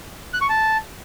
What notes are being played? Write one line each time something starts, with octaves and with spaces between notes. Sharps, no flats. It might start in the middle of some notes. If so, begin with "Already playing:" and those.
F#6
C#6
A5